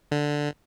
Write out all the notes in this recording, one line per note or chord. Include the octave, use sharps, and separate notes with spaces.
D3